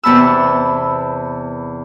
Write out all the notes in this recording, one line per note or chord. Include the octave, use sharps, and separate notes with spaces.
E2 C3 B3 A5 B5 E6